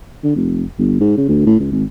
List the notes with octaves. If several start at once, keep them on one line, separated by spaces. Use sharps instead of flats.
D3
F1
G1
G#2
C#3
D2
A2
C#2
G#1